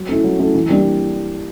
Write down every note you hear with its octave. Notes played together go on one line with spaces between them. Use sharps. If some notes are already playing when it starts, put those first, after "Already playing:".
Already playing: F#3
A3 C#4 E4
F#3
A3 C#4 E4
E3
G3 A#3 D4